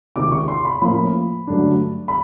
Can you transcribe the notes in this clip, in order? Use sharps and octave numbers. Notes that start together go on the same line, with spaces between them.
C#2 C3 D#3 D6
C#6
C6
B5
A2 F3 A#3 C#4 F4 B5
G2 D3 F#3 A3 D4
B5